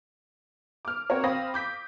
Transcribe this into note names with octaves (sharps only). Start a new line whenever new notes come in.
D6 F6
C4 F#4 A#4 C#5
C4 F5 B5 D#6 A#6
D6 G6 B6